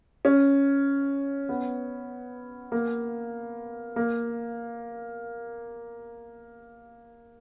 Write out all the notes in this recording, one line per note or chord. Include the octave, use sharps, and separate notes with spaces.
C#4
B3
A#3
A#3